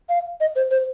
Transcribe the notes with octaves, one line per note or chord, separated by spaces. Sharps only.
F5
D#5
C5
C5